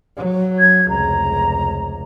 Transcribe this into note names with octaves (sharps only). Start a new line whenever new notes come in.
F#3
G#6
F1 C#2 A#5